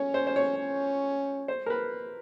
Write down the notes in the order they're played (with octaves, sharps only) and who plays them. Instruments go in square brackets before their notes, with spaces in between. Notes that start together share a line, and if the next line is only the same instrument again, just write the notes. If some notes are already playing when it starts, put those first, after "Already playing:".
Already playing: [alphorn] C#4 [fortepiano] C#5
[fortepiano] C5
C5
C#5
[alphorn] C#4
[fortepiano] C5
A#4
B4